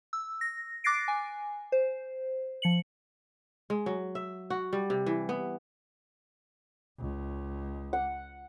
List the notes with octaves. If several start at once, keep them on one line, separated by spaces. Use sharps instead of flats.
E6
A#6
D6 F#6 A6 A#6 C7 D7
G#5
C5
F3 C#7 F#7
G#3
F#3
E5
F#4
G3
C3
E3
B3
C#2
F#5